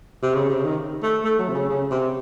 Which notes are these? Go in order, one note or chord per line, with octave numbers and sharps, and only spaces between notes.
C3
C#3
C3
C#3
D#3
A3
A3
F#3
C3
C#3
C#3
C3